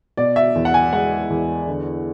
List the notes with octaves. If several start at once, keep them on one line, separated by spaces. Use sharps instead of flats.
B2 D5
E5
E2
F#5
G#5
G#3 F#5
E2
D3